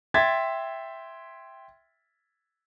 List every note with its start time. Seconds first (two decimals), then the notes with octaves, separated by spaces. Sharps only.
0.14 E5 G5 C6 G#6 A6 B6